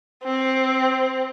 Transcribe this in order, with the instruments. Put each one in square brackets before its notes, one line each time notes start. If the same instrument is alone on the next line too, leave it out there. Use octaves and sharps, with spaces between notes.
[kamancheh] C4